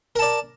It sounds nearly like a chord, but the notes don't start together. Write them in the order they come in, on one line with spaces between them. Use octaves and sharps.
A#4 A5 D5